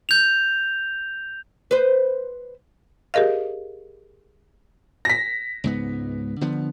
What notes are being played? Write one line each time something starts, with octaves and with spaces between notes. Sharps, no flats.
G6 F7
B4 C5
G4 G#4 A#4 D#5 F5
A#6 B6
C#2 G#2 B3
D3 F3 B3